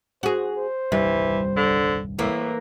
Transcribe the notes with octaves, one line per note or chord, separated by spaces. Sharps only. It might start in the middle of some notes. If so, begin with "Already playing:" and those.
F#4 G#4 C5
C5
D#1 C2 G2 E3 G3
D3
A2 E3 A#3